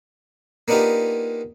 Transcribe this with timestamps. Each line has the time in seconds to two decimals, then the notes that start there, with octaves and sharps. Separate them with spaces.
0.68 A#3 B3 D4 D#4 F4 G4